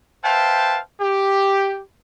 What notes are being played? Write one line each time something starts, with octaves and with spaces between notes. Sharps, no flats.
B4 C5 E5 F5 G5 A5
G4